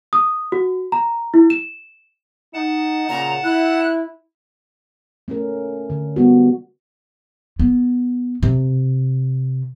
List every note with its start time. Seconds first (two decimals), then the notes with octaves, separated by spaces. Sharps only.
0.13 D#6
0.52 F#4
0.92 A#5
1.34 E4
1.50 E7
2.54 D#4 F#5 A5
3.09 A#2 C#3 A#5
3.44 E4 F#6
5.28 A3 C#4 A#4
5.90 D3
6.16 G3 B3 F#4
7.59 B3
8.43 C3